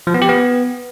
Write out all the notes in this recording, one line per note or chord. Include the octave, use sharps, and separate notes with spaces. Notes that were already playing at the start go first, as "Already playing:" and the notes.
F3
B3
G4
B3